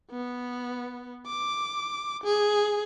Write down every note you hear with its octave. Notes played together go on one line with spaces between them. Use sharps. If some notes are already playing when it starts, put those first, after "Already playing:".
B3
D6
G#4